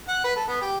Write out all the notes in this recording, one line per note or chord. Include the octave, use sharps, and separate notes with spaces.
F#5
B4
A4
B3
G4